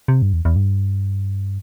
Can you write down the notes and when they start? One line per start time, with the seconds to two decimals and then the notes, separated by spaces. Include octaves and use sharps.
0.08 C3
0.22 G2
0.33 E2
0.45 E2
0.56 G2